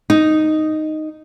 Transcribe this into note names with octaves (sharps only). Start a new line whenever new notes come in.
D#4